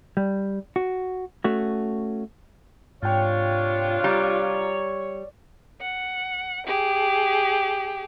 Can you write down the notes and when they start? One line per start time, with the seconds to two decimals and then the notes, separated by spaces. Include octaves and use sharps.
0.17 G3
0.76 F#4
1.44 A3 C#4 F#4
3.03 G#2 C3 D4 F4 C#5 G5
4.04 G3 A#5
5.81 F#5
6.66 G4 G#4